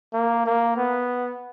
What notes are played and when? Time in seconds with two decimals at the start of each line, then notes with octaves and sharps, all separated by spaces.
0.14 A#3
0.46 A#3
0.76 B3